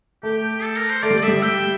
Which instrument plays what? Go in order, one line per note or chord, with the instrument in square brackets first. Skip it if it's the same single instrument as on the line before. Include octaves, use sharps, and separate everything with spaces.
[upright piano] A3 [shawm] G4
[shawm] A4
A#4
C5
[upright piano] A3 [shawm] D5
[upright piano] G3
[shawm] D5
[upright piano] G3 [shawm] E5
[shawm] G5